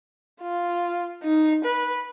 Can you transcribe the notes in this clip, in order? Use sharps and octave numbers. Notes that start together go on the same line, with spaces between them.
F4
D#4
B4